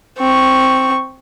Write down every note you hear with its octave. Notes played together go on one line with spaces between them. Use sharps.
C4 C#6